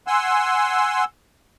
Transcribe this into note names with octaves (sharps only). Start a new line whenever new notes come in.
F#5 G#5 C6 E6